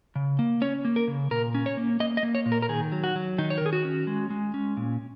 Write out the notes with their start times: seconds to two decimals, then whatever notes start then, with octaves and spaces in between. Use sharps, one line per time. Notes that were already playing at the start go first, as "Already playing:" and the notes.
0.16 C#3
0.39 A#3
0.62 C#4 C#5
0.85 A#3
0.96 A#4
1.08 C#3
1.31 A#2 A#4
1.55 C#4
1.66 C#5
1.77 A#3
2.00 A#3 D#5
2.17 D#5
2.23 A#3
2.35 C#5
2.46 A#2
2.52 A#4
2.62 A#4
2.69 D#3 G#4
2.92 F#3
3.04 F#4
3.16 F#3
3.38 D#3 D#4
3.50 C#5
3.58 A#4
3.61 D#3 G#4
3.73 F#4
3.85 C#4
4.07 G#3
4.30 G#3
4.54 C#4
4.77 A#2